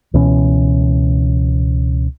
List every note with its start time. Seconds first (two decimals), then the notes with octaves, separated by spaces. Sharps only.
0.14 C#2 B2 E3 C#4